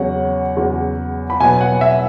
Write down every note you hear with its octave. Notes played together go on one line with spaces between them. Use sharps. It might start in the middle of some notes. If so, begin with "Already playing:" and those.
Already playing: E2 C#3 F#3 C#4 F#5
E2 C#3 F#3 C#4
B5
B2 F#3 B3 G#5
F#5
E5